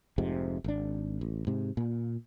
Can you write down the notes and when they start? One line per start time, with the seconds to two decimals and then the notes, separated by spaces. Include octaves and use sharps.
0.18 F1 F2 G#2 C3
0.64 G#1 D4
1.21 A1
1.47 G#2 C3
1.77 A#2